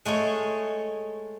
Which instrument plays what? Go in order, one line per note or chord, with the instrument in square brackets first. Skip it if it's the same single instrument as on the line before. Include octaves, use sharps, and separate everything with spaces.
[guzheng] G#3 A3 G#4 C#5